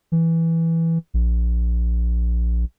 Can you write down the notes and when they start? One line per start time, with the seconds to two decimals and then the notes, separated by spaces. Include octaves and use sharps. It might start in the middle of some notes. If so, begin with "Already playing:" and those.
0.12 E3
1.14 A#1